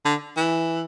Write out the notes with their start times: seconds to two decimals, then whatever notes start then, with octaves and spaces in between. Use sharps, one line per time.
0.05 D3
0.37 E3